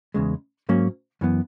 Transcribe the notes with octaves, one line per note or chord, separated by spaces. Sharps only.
E2 C#3 G#3
G#2 F#3 A#3 C#4
F#2 E3 B3